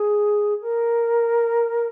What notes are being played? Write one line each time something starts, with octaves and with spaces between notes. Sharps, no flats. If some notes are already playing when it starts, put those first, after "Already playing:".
Already playing: G#4
A#4